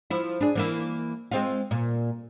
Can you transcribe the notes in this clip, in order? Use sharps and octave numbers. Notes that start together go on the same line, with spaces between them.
F3 E4
D4 G#4
E3 A#3 E4
G#3 C4 F4
A#2